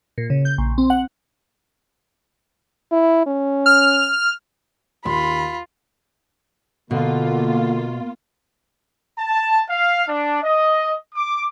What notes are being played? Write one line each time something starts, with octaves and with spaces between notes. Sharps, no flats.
A#2
C#3
G6
A#1
C4
F#5
E4
C#4
F6
D#2 F4 B5 C6
B2 D3 A#3 F4
A5
F5
D4
D#5
D6